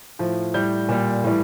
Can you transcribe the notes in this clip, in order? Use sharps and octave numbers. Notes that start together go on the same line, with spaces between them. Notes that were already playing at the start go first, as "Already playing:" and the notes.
A2 F3
A2 G3 G6
A#2 G3
A2 E3 G3